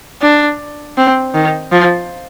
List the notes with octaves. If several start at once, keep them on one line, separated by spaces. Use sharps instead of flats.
D4
C4
D#3
F3